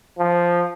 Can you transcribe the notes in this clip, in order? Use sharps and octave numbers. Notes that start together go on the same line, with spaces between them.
F3